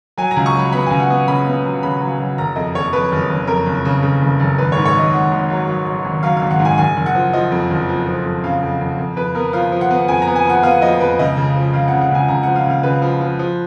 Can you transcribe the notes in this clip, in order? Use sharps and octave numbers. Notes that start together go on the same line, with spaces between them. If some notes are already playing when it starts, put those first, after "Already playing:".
F#3 G#5
A#5
C#2
C#6
F#3 B5
B3 B5
C#2 G#5
F#5
B3
C#3 B5
B3
F#3
C#3 B5
F#3
F#3
F#1 A#5
F2 D#5
F#1 C#5
F2 B4
F#1
F#1
F2 A#4
F#1
C#3
C#3
F#1
F#1
G#1 B4
G#2 C#5
C#5
G#1 D#5
G#1 F#5
G#1
F#3
F#3
F#3
G#1
F#3 F5
G#1 F5
F#5
G#2
G#5
F#1 G#5
F#1
F#5
F3
F3 D#5
F2
F#1
F3
F3
F2
C#3 F5
F2
F2
F2
F2 B4
B3 A#4
F3 F5
F3
F#5
B3
F2 G#5
A#5
B3
G#5
F3 F#5
B3 F5
F3 D#5
F2 B4
C#2 D#5
C#3
F3
C#2 F5
F#5
C#3
F#5
C#2 G#5
C#2 A#5
F3 F#5
F5
C#2 F5
C#3 B4
F3
F3
F3